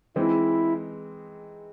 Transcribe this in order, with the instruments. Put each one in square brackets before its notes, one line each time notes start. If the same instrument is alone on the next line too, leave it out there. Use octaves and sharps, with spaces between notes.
[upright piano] E3 G#3 C4 D#4 [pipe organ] E4